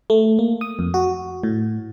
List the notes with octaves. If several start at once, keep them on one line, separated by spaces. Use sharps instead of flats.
A3
A#3
D#6
F2
F#4
A2